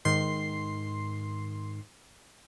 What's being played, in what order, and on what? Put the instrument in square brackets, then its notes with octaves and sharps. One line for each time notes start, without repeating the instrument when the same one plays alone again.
[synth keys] G#2 D#3 C6 C7